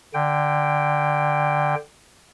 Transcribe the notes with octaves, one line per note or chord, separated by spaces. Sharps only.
D3 G5